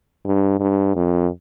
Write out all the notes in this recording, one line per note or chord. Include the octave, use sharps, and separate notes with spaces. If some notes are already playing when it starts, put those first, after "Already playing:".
G2
G2
F2